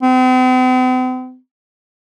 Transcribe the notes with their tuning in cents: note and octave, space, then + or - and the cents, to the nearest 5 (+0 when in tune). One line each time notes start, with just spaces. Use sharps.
C4 -45